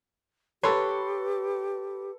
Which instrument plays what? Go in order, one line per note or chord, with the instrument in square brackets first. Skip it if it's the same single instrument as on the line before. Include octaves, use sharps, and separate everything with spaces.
[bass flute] G4 [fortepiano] A4 C6 [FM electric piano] B4 [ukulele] C#5